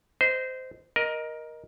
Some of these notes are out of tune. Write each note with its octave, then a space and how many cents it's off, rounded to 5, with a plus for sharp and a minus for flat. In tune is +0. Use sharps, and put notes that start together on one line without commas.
C5 -20 D#5 +15
A#4 +15 D#5 +0